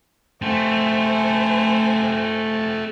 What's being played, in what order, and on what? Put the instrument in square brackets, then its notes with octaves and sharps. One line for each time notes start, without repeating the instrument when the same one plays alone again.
[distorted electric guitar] A3 C4 [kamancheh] C5 G#5